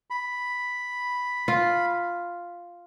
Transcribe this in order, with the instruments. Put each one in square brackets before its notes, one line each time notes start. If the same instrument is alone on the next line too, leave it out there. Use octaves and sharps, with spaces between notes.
[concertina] B5
[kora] F4